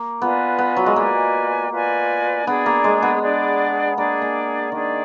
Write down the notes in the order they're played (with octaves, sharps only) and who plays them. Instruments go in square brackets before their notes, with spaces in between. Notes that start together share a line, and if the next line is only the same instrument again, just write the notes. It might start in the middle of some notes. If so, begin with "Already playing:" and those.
Already playing: [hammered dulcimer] A#3
[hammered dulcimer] B3 [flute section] F4 B4 D5 G#5
[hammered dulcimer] B3
F#3
G#3
[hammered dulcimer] A#3 [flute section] F4 B4 D5 G#5
[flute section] F4 B4 D5 G#5
[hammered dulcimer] B3 [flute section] D4 G#4 D5
[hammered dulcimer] A#3
G#3
B3
[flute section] D4 G#4 D5
[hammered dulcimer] A#3 [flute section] D4 G#4 D5
[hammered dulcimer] A#3
[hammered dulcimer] D#3 [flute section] D4 G#4 D5